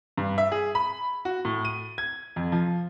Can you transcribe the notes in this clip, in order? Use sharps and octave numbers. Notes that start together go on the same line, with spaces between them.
G2
E5
G#4
B5
F#4
A2
D#7
G#6
F2
F3